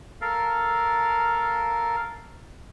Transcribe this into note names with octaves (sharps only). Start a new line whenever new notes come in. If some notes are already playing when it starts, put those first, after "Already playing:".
A4 A#4 F5